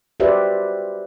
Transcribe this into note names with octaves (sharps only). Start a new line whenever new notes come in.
F#4 G4 B4 C5 D5 E5